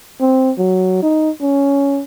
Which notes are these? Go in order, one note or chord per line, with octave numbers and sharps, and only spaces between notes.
C4
F#3
D#4
C#4